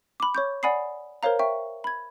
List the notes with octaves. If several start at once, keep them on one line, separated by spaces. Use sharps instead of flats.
B5 D6
C#5 C#6 G6
D5 F#5 G#5 B5 D#6 C7
A#4 C5 C#5 F5 A#5
E5 G5 C#6
B5 G#6